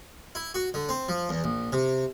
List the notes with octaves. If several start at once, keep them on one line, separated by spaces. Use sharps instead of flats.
E4
F#4
D3
C4
F3
E2
A#1
C3